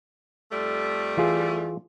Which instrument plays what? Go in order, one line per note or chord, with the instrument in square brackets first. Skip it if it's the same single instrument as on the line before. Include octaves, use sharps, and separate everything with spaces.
[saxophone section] F2 G3 A3
[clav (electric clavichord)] E3 F4 G#4